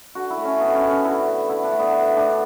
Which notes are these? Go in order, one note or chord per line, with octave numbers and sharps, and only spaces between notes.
D3 F#4
E4
A3
C#4
D3 B3
C#4
A3
C#4
D3 E4
A3
D3 E4
D4
A3
B3
D3
A3 D4